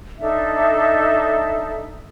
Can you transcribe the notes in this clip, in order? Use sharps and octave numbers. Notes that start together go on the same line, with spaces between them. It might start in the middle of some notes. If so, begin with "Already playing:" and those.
D4 D#4 A4 E5